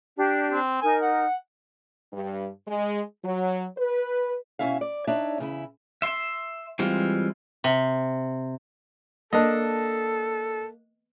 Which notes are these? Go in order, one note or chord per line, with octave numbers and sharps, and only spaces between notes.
D4 G4
C4
D#4 A#4 G#5
F#5
G2
G#3
F#3
B4
B2 F3 C#4 E4 E5 F5
D5
D4 D#4 C#5 D5 E5
E2 C#3 E4
E5 C6
E3 G3 G#3 C4 F4
C3
A#3 D4 A4 D#5